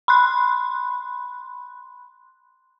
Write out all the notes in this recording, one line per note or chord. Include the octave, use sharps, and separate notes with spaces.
B5 C6 F#6